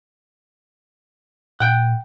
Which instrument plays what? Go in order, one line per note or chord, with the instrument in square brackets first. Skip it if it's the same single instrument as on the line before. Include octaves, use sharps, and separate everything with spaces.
[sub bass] A#2 [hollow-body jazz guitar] F#5 G5